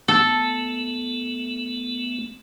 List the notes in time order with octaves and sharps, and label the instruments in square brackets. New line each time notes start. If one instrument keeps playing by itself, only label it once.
[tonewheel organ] A3 B3 [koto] A4